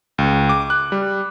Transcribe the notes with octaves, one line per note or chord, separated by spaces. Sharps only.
C#2
D6
F#6
G3